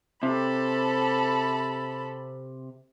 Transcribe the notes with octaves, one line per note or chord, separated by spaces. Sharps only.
C3 A4 B5